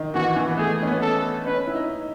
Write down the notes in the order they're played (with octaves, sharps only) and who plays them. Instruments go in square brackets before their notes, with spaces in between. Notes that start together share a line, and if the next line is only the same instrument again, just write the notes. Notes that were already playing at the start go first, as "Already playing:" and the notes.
Already playing: [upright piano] D#3
[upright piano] E3 [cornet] F#4
[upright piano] E3
B3
[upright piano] A3 [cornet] G#4
[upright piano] C#4
B3
[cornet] A4
[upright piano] C#4 [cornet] B4
[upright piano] E4
D#4